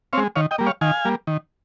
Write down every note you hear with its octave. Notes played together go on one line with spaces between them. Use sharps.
G#3 C4 C#5 F5
D#3 C#5 F5
D#5 G5
G3 A#3
C#5 F5
D#3 F5 G#5
G3 A#3
D#3